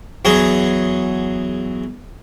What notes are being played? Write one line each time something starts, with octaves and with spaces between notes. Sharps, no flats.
E2 F#3 G#4